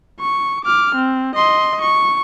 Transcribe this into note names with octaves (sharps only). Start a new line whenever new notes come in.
C#6
D6 F6
C4
D#5 C6
C#6